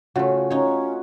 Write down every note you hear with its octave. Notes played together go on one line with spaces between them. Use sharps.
C#3 A3 F4 F#4
C#4 D#4 C#5